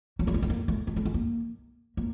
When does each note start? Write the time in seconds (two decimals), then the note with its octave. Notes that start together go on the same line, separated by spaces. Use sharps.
0.19 F#3
0.27 G3
0.34 G#3
0.42 A3
0.50 A#3
0.68 A3
0.87 G#3
0.96 A3
1.05 G#3
1.14 A#3
1.97 A#3